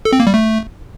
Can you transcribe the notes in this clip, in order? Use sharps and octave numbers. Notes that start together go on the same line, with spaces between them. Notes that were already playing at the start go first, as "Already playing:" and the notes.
A4
C4
A#3
G3
A3